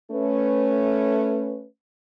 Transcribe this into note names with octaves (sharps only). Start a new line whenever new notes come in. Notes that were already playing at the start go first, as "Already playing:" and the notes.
A3 C#4 B4